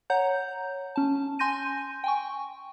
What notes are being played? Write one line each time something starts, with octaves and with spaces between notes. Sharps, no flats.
C#5 F#5 A#5 G6
C#4 A5
G#5 C6 G6 A#6 D#7
G5 G#5 C#6